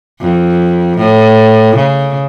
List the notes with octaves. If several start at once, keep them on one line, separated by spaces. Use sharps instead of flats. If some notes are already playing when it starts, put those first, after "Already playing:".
F2
A2
C#3